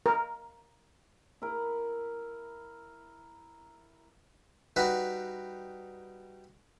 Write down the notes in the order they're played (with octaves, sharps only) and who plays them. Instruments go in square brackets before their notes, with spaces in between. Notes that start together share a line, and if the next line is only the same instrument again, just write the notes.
[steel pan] A#4
[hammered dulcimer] E4 A#4
[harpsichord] G3 D#4 F#4 B4